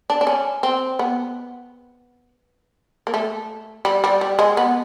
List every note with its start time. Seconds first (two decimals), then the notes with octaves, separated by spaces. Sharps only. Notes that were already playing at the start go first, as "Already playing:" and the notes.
0.10 D4
0.21 D4
0.27 C#4
0.63 C4
0.99 B3
3.07 A#3
3.14 A3
3.85 G3
4.04 G3
4.21 G3
4.39 G#3
4.57 B3